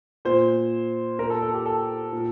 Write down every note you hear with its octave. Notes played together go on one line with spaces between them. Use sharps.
A#2 C5
A#2 A#4
A4
A4
G4
A4
A#2